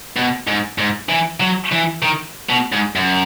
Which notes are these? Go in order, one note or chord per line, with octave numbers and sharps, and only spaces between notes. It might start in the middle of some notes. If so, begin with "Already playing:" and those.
B2
G#2
G#2
E3
F#3
E3
D#3
B2
G#2
F#2